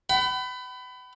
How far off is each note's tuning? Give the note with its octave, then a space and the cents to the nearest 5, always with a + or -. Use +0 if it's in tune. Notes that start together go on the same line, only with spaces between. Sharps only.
F#5 +45 B5 +20